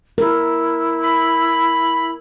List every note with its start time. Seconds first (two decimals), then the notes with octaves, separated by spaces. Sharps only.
0.18 E4 A#4
1.02 B5